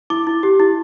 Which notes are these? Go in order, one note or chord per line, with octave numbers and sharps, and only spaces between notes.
E4 D6
E4
G4
E4